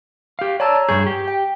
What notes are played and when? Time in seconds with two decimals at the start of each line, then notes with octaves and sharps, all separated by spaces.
0.39 G4 F5
0.60 C#5 D5 A5 A#5 E6
0.89 G2 G#4 C#6 G6
1.07 G4
1.28 G5